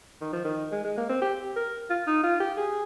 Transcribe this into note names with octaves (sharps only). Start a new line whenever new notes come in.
D#3
F3
D#3
G#3
G#3
A#3
C4
G4
A#4
F4
D#4
F4
G4
G#4